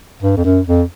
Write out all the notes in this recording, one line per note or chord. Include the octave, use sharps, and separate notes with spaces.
G2
F2
F#2
F2